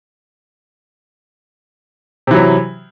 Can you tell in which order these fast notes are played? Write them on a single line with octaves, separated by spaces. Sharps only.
C3 E3 F#3